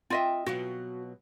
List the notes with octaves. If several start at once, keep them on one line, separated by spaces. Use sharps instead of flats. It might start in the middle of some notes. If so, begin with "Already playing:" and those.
C4 F4 D#5 E5
B2 F#3 F4 F#4